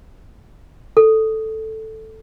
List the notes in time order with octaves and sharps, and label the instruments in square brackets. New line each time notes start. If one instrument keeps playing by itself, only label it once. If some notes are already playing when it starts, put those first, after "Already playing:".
[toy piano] A4